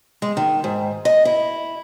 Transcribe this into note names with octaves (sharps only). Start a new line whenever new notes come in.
G#3
D#3
G#2
D#5
E4